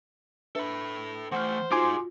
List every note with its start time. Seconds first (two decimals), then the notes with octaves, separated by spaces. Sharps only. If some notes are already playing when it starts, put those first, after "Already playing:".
0.55 D4 A4 B4 E5 B5
1.32 E3 A3 C5 F#5 F6
1.72 D#4 F4 F#4 G#4 G#5 C6 D6